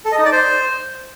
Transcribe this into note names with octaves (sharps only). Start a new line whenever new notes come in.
A4
D#5
D#4
D5
C5